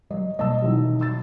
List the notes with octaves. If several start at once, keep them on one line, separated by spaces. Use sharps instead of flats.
F#3 G3 D#5
B2 G3 A#3 D#5 A5 E6
D#3 E3 F#3
E6 A6